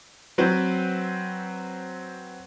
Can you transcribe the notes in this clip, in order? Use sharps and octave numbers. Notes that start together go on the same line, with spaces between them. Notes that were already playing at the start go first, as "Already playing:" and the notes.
F#3 C4 B4 C5